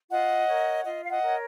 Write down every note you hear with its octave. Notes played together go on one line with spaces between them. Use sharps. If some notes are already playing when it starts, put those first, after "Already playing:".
F4 D#5 F#5
A#4 C#5
F4 D#5
F5
D#5 F#5
A#4 C#5